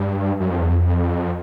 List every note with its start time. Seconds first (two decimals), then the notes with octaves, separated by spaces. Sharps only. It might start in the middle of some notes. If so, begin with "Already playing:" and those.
Already playing: G2
0.40 F#2
0.50 F2
0.60 E2
0.71 F2